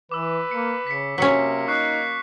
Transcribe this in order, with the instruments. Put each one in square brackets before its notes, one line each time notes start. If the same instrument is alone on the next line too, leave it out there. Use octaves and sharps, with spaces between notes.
[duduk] E3 [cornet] B4 [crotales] D6 E6
[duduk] A#3 [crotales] C#7
[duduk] C#3 [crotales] B6 C#7
[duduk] C3 [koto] F#3 C#4 [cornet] A#3 [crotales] B6 C#7
[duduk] D#4 [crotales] C#6 F#6 C7